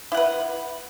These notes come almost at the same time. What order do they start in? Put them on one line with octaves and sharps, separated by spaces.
E4 F#5 B4